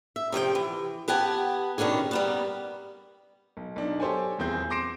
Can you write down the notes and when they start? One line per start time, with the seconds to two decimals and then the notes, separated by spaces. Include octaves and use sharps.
0.16 E5
0.32 C3 F3 C#5 G5
0.55 E3
1.08 B3 G4 F#5 G#5 A5
1.78 B2 D#3 C#4 D4 G#4
2.11 G3 A#3 B3
3.57 B1
3.76 B1 D4 D#4
4.00 G4 A4 C5 C#5 G#5
4.38 D#1 E2 C4 G#4 G6
4.70 C6 D6 A#6 C7 D7 E7